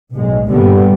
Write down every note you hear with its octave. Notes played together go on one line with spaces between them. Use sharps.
B1 A2 G#3
G1 G2 A#2 D3 G3 B3